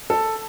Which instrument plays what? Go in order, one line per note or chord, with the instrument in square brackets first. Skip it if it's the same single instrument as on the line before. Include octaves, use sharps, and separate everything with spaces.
[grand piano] A4